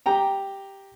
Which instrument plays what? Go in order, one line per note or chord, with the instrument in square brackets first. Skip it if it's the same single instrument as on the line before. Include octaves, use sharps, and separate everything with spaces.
[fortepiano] G4 G5 A#5